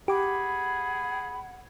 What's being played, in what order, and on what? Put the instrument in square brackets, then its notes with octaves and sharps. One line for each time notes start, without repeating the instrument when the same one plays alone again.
[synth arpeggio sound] G4 D6 [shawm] G#4 [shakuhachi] F#5 [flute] B5